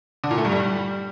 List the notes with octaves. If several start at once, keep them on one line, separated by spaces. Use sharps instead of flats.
D3
A#2
A3
G2
G3